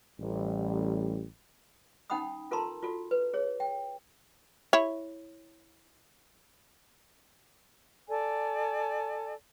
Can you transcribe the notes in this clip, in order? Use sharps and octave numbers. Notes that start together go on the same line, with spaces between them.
A1 G3
C#4 D#4 F#5 G5 B5 D#6
F4 A4 A#4 A5 A#5 C6
F4 F#4 A4
B4
G#4 C#5
G5
E4 C#5
A4 D5 G#5